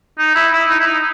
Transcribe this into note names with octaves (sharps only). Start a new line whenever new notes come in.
D#4
E4
E4
D#4
E4
D#4